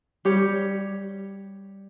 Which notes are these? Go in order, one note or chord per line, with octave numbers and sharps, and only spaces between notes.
G3 G4 C#5